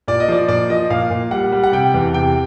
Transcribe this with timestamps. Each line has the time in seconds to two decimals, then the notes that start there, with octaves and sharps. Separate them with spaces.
0.08 A#2 D5
0.20 D#5
0.28 F3 D5
0.48 A#2 D5
0.69 F3 D#5
0.90 A#2 F5
1.10 A#2
1.31 G3 F#5
1.52 G3
1.63 F#5
1.72 C3 G5
1.94 E2
2.14 C3 G5